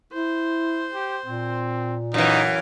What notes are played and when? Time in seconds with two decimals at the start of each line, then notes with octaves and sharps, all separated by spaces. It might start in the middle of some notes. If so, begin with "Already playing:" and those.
0.13 E4 C5
0.93 G4
1.26 A#2 C4
2.14 F#2 E3 D#4 F5